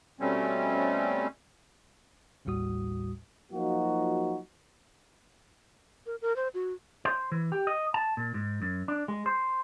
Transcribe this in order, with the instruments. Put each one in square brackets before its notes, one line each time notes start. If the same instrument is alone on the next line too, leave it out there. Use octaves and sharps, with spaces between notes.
[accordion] B2 G3 A3 C4 C#4
[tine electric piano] A1 D#2 A2 G3 F#4 D#6
[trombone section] F3 F#3 A#3 D#4 F4 F#4
[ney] A#4
A#4
C5
F#4
[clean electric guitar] C5
E3
G4
D#5
A5
A#2
G#2
F#2
D4
G#3
C5